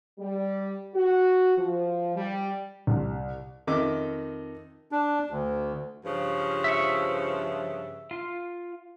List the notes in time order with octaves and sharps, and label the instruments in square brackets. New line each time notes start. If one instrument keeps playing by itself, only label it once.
[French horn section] G3
F#4
F3
G3
[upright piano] C2
[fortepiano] F2 D#3 D#4 E5 D6
[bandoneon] D4
D2
[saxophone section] G2 C#3 F3
[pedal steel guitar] E5 C#6
F4